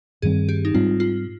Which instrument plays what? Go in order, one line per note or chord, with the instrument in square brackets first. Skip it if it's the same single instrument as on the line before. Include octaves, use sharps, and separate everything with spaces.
[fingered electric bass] G2 D#3 G3 C4 [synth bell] G#4
[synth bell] G4
D#4
[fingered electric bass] G#2 G3 C4 [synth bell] F4
[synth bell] F4